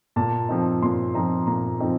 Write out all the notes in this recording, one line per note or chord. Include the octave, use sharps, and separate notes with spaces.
A#2 A5
F3 C4 D#4
A#2 C6
F3 C4 D#4 A#5
A#2 A#5
F3 C4 D#4